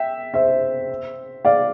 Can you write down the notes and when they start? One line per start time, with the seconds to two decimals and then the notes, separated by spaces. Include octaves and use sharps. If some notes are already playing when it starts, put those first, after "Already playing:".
Already playing: E5 G5
0.34 C5 E5
1.45 D5 F5